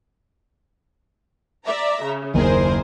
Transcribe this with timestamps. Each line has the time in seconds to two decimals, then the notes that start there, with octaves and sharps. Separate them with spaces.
1.65 D5 E5 A#5
2.04 C#3
2.34 F#1 D#2 G#4 A#4 C5